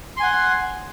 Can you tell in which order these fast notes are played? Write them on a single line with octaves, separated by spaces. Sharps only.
C6 G#5 F#5